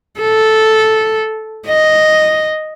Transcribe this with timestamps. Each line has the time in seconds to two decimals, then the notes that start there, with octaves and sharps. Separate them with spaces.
0.20 A4
1.67 D#5